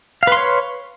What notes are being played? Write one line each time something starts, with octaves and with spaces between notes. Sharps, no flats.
B4 C#5 F5 C6